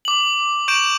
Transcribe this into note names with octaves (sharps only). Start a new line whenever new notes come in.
D6 F#7
C#6 G6 D7 E7 F#7